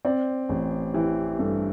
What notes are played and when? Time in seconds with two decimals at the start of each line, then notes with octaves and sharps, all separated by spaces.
0.05 C4 D5
0.49 A1
0.94 E3 G4
1.39 G2 A4